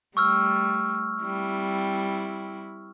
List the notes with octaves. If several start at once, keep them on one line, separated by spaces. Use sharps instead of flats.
G3 A3 C#6 E6 F6
G3 C4 E4